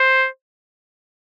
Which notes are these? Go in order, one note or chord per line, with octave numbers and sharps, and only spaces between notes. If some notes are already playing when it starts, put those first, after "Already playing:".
Already playing: C5